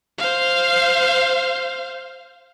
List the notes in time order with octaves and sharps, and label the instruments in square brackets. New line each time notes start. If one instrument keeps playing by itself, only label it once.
[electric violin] C5 F5